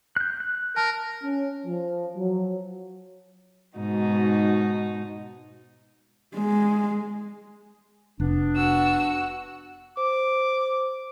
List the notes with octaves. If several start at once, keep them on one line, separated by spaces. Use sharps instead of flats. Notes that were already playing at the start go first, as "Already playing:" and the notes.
F#6 G6
F#6
A#4 A5
C#4
F3
F#3
G#2 B2 D#4 F#4
G#3
F1 B3 D4
F#4 E6
C5 D6